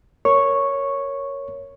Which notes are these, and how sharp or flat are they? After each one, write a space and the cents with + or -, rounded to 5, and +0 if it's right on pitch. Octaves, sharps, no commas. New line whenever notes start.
A#4 +0 C#5 +0 C#6 -5